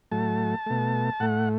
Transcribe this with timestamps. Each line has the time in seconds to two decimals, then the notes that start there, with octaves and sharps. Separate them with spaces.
0.11 A2 F#3 A3 A5
0.66 B2 A3
1.20 A2 A3 F#5